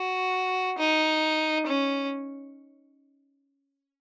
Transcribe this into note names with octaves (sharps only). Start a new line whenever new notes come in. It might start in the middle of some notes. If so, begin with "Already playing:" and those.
Already playing: F#4
D#4
C#4